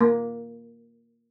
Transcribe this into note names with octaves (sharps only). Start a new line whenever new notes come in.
A#3